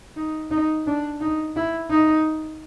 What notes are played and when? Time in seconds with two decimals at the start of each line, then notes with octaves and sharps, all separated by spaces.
0.17 D#4
0.51 D#4
0.87 D4
1.21 D#4
1.56 E4
1.91 D#4